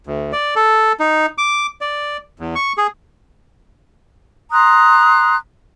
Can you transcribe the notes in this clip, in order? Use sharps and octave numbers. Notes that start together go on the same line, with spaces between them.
D2
D5
A4
D#4
D6
D5
E2
C#6
G#4
A#5 C6 D#6 F#6